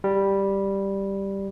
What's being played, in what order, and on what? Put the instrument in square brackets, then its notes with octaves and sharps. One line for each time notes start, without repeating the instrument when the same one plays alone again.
[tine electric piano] G3